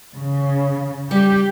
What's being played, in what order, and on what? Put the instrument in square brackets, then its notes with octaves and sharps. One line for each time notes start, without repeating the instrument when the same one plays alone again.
[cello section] C#3
[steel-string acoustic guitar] G3 [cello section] G4